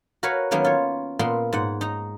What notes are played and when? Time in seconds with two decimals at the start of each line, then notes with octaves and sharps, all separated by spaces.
0.23 F#4 A#4 B4 C#5 F5
0.51 D#3 F#3 A#3 B3 C#4
0.64 F4 C#5
1.19 A#2 A#3 B3 C6
1.53 G#2 F#5
1.81 D#4 A#5